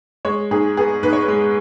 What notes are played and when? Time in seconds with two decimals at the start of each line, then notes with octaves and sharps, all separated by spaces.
0.25 G#3 C#5
0.51 G#2 G#4
0.77 B3 G#4
1.03 G#2 B4
1.13 C#5
1.22 B4
1.28 G#3